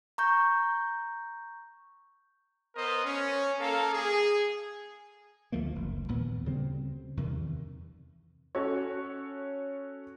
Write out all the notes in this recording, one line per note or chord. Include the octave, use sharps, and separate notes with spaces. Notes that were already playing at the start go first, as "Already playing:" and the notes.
A#5 C#6 G6
B3 A#4 C5 D#5
C#4
A#3 A4 A#4 F5
G#4
D2 F3 A3 A#3
F#1
D#2 A#2 B3
D2 C#3 G3 C4
E2 G2 C3 D#3
C#4 F#4 A4 C#5